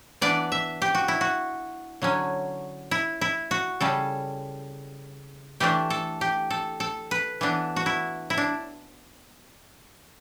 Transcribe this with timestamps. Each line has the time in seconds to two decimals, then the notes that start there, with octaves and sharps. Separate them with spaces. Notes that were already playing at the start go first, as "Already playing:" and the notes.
0.21 E3 B3 D4 D5
0.52 E5
0.82 G4
0.95 F#4
1.08 E4
1.21 F#4
2.02 D3 F#3 C#4
2.91 E4
3.21 E4
3.51 F#4
3.81 C#3 G3 C#4 A4
5.60 E3 A3 D4 G4
5.90 A4
6.21 G4
6.50 A4
6.80 A4
7.11 B4
7.41 E3 B3 D4
7.76 F#4
7.86 E4
8.30 E4
8.38 D4